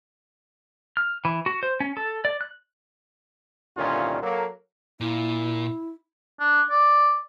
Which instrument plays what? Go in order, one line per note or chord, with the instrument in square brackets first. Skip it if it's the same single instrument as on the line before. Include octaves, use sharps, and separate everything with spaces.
[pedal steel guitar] F6
E3
F#4
C5
C#4
A4
D5
F#6
[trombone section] C2 A#2 D3 D#3 C#4 F4
F#3 A#3 A4
[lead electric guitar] A#2 [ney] E4
[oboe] D4
D5